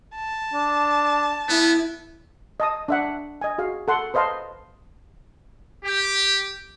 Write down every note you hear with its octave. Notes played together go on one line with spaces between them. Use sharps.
A5
D4
B3 E4
D#5 A5 D#6
D4 E5 F#5
D#5 G#5
F#4 G#4 F5
A4 F#5 C6
B4 C5 D#5 F5 A5 C6
G4